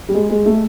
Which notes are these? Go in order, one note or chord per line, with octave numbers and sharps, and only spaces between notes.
G3
G#3
G#3
A3